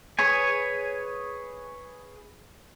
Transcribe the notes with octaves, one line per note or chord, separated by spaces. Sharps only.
G#4 B4 C#5 G#5